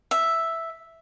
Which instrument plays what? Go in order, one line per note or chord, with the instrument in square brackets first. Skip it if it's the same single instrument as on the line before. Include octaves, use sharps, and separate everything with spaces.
[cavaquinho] E5